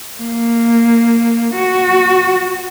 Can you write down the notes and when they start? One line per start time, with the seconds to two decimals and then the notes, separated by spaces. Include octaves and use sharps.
0.21 A#3
1.55 F#4